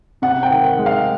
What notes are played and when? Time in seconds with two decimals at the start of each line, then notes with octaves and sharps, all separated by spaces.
0.22 C3 F#5
0.43 G5
0.50 D#3
0.65 F#5
0.79 G#3
0.86 F5